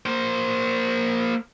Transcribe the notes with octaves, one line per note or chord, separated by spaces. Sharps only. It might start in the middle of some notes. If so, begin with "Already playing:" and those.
A#3 C5